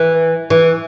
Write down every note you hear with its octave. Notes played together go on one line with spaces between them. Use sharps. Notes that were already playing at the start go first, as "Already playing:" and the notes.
Already playing: E3
E3